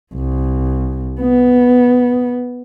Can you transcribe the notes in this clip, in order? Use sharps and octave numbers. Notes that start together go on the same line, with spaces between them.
C2
B3